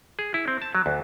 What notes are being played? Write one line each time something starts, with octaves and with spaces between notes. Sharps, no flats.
G#4
E4
C4
A5
F#3
D2